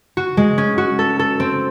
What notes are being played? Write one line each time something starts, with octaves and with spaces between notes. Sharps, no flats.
F#4
G#3
C#4
F#4
A4
A4
C4